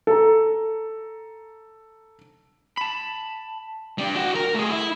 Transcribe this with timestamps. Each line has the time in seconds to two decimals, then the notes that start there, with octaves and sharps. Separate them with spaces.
0.07 A4 A#5
2.77 A5 B5
3.98 G3 D4
4.15 F#4 G5
4.35 A#4
4.54 A3 G#4
4.70 E4